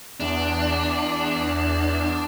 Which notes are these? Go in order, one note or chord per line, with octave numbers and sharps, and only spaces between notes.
E2 D4